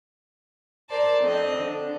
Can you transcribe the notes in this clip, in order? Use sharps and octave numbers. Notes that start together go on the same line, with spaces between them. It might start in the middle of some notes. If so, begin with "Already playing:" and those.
A#4 C5 D5 A5
F2 C4 D4 D#5
D3 D4